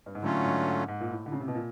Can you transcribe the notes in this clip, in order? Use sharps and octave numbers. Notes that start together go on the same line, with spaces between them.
G2
G#2
A2 D3 F#3 A3 C#4 F4
G#2
G#2
G#2
A#2
A2
D3
C#3
C3
B2
A#2